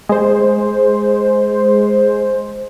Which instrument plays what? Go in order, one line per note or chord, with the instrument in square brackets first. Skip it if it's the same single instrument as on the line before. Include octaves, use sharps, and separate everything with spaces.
[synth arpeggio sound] G#3 C5